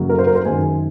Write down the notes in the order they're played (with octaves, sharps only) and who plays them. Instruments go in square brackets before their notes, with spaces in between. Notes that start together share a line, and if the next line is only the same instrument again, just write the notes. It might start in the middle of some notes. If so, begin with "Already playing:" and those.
Already playing: [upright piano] F#2 C#3 F#3 A#3
A#4
C5
A#4
C5
F#2 D#3 G#3 G#5